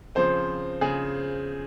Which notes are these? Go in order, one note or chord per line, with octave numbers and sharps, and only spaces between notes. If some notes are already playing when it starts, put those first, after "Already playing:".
C#3 F3 C4 C5
C#3 G#4